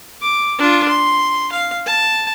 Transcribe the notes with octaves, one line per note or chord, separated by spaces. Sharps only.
D6
D4 F4
C6
F5
A5